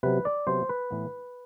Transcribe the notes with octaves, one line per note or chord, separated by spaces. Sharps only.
C3 F#3 B3 B4
D5
C3 F#3 B3 C5
B4
A2 E3 B3